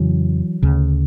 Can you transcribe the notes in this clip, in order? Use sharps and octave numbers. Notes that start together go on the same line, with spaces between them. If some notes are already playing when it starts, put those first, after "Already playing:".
Already playing: F2 C#3 E3 F#3
D2 C#3